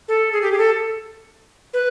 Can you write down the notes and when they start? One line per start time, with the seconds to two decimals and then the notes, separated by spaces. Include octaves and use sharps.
0.08 A4
0.32 G#4
0.42 G4
0.52 G#4
0.58 A4
1.73 B4